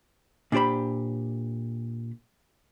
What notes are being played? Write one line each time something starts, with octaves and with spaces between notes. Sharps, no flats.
A#2 D4 G4 C5 B5